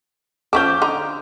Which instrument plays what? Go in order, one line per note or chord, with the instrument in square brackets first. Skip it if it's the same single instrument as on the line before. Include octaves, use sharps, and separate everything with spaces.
[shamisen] F3 C#4 A4 [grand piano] D6 G6
[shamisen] D3 D#4 A#5